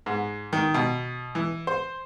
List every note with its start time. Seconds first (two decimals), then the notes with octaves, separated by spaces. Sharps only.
0.06 G#2
0.53 D#3
0.74 B2
1.35 E3
1.67 C5